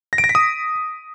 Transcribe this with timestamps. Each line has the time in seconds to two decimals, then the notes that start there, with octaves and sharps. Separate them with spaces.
0.13 A#6
0.18 D7
0.24 A#6
0.29 B6
0.35 D#6